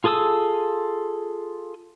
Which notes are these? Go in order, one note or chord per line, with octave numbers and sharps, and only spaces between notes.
F4 G#4 A4 D#6 E6